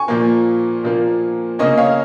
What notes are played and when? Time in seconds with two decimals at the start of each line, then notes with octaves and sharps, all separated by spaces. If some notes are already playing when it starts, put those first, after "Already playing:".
Already playing: G#5 C#6
0.08 A#2 F3 A#3
0.84 A#2 F3 A#3
1.59 C#3 A#3 C#4 D#5
1.78 C#5 F5